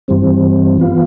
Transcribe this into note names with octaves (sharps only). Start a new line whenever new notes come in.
G2 E3 G3 C4
E3 B3 F4